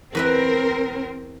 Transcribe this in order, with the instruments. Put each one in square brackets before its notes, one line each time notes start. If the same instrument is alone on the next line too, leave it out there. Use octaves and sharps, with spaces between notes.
[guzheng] E2 B4 E5 [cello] C4 [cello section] A#4